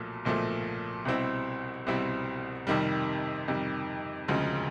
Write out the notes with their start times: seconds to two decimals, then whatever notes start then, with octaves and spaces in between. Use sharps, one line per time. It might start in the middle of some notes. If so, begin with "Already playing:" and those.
Already playing: B1 A#2 F3 A3
0.25 B1 A#2 F3 A3
1.05 C2 B2 G3 C4 E4
1.87 C2 B2 G3 C4 E4
2.67 F2 C3 D#3 G3
3.48 F2 C3 D#3 G3
4.28 E1 D2 C#3 F3 G#3